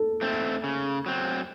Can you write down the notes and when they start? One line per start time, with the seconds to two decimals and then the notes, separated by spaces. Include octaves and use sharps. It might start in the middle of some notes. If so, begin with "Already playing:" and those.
Already playing: A4
0.21 A3 C4
0.64 C#3
1.06 F#3 C4